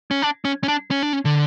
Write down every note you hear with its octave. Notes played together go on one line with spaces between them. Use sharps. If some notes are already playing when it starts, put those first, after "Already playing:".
C#4
D4
C#4
C#4
D4
C#4
D4
C#4
D3